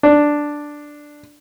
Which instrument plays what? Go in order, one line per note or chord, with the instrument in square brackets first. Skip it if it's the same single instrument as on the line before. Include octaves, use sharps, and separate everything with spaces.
[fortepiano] D4